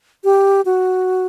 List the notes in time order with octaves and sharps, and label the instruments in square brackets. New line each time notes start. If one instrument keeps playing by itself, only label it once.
[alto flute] G4
F#4